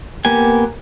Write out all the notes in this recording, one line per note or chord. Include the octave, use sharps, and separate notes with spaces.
A#3 B3 G4 G#5